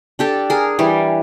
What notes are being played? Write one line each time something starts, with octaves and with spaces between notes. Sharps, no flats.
D4 G4 A4
G#4 A#4
E3 G3